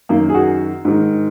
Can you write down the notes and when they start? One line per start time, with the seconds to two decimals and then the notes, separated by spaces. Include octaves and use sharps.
0.09 F#2 D#3 A#3
0.29 G#4
0.35 F#4
0.85 G#2 D#3